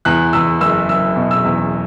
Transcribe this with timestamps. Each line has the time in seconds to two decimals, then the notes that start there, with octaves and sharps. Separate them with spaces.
0.05 E2 F#6
0.33 E2 E6
0.61 F#1 E6
0.89 F#1 E6
1.16 B2
1.31 E6
1.45 E2